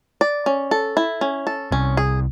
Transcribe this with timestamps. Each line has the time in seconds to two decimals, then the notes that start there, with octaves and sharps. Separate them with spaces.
0.21 D5
0.46 C#4
0.71 A4
0.97 E4
1.21 C#4
1.47 A4
1.72 C2 C3 C#4
1.97 G#4